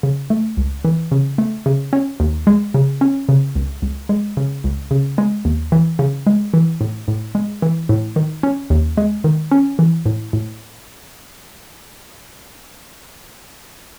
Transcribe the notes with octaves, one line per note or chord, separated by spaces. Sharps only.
C#3
A3
C#2
E3
C#3
A3
C#3
C#4
D#2
G#3
C#3
C#4
C#3
C#2
C#2
G#3
C#3
C#2
C#3
G#3
D#2
E3
C#3
G#3
E3
A2
A2
G#3
E3
A2
D#3
C#4
D#2
G#3
D#3
C#4
E3
A2
A2